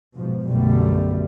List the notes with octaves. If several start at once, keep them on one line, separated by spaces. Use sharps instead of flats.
G#2 B2 F3
B1 F#2 B2 D3 G3 A3